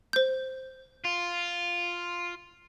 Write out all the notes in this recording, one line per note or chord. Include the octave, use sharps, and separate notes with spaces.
C5 G6
F4